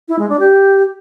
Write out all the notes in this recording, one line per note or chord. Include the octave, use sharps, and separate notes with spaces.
E4
G#3
D4
G4